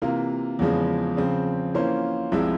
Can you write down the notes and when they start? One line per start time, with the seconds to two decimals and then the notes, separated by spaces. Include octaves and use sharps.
0.02 C3 E3 A#3 F4
0.59 E2 C#3 F3 G#3
1.17 C#3 F3 C4
1.74 E3 A#3 C#4 F4 C5
2.32 C2 C3 F3 G#3 E4